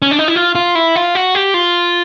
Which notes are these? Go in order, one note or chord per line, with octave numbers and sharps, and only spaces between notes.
C#4
D4
D#4
E4
F4
F4
E4
F4
F#4
G4
F4